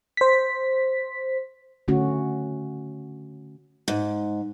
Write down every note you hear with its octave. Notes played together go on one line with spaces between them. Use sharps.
C5 B6
D3 A3 C#4 F#4
G#2